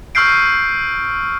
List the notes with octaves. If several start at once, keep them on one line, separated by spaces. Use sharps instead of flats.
C#6 E6 F6 G6 C7 D7